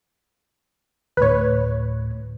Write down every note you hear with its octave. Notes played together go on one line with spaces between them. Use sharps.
D2 A2 B4 C#5